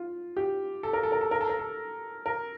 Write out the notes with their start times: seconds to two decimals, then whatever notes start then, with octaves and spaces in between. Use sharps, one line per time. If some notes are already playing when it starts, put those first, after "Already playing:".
Already playing: F4
0.37 G4
0.83 A4
0.93 A#4
1.03 A4
1.12 A#4
1.21 A4
1.31 A#4
1.41 A4
1.49 A#4
1.59 A4
2.26 A#4